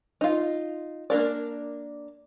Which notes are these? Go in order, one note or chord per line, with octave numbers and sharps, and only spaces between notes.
D#4 F4
A#3 D4 A#4 D5